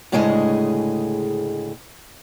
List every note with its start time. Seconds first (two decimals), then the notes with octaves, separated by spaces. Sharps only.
0.12 D2 A2 C#3 G#3 G#4 D#5